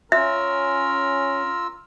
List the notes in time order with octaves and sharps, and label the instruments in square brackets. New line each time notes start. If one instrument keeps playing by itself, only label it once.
[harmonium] C#4 [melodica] F4 E6 [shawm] A#4 [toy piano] E5